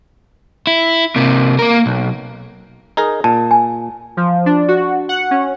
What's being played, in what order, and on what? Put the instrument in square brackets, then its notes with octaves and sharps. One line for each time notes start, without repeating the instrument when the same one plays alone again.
[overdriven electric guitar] E4
C3 A#3
A#3 A#4
B1
[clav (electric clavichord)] D#4 G#4 A#4
[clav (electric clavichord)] A#2 [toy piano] A5
[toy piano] G#5
[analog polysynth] F3
D4
F#4
F#5
C#4